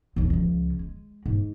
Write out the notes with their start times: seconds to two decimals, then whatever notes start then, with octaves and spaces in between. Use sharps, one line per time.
0.16 A1 D#2
0.30 C#2 F3
0.79 G#3
1.26 G#2